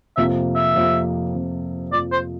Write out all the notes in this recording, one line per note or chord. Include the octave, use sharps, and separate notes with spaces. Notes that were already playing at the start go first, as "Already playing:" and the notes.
F2 C3 F3 A#3 E5
E5
F2 C3 F3 A#3
F2 C3 F3 A#3
F2 C3 F3 A#3 D5
C5